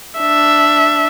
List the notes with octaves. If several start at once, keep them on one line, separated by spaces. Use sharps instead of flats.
D4 E5